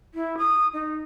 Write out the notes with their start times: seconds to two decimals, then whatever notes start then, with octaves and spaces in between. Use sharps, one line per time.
0.14 E4
0.38 D#6
0.73 D#4